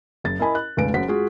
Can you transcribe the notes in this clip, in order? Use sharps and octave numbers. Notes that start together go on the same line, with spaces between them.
F#1 A6
E4 A#4 D#5 G#5 B5
F#6
F1 C#2 B4 G#5 D7
F#1 F#2 C5 F#5 B6
G#3 F4 F#4 G#4